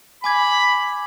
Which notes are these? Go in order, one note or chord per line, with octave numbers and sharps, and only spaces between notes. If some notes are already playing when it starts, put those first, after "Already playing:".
G#5 B5 D6 G#6